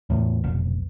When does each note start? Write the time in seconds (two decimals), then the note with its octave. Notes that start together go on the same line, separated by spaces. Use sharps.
0.10 E2 A2
0.44 F1 B1